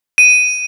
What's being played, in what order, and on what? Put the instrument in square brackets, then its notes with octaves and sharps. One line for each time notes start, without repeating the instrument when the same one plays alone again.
[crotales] D#7